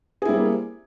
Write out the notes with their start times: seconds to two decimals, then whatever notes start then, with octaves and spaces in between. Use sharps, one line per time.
0.22 G#4
0.25 E4
0.29 G3
0.32 C4
0.36 A#3